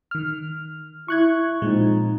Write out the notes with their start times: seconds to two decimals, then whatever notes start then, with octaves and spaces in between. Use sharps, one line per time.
0.11 D#3 F6
1.08 E4 C#6 F#6 G#6
1.62 A#2 F3 G#3 C4 D#4